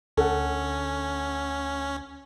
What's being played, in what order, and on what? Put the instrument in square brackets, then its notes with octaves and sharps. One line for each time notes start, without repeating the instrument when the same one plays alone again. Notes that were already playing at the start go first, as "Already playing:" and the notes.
[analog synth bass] D2 [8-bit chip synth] C#4 [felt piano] A4 F#5